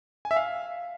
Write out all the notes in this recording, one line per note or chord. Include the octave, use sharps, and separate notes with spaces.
G#5
E5
F5